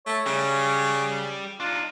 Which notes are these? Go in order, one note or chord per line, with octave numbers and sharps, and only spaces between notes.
A3 C#5
C#3 G3
D4 D#4 F4